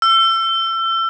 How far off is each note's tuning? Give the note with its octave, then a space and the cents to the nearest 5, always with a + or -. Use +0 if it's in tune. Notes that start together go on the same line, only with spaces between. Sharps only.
E6 +30